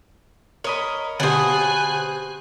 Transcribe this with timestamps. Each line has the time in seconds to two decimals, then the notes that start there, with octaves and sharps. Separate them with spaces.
0.64 A#4 C#5 D#5 B5
1.20 B2 D3 G4 C5 F#5 G#5 D#6 F#6